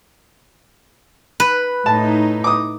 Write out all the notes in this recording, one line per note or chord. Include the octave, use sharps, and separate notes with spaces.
B4
A2 D#4 A5
D6 D#6